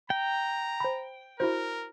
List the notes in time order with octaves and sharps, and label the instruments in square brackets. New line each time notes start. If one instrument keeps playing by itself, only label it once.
[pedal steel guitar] G5 [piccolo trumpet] A#5
[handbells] C5 B5
[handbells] E4 F#4 C5 [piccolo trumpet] A#4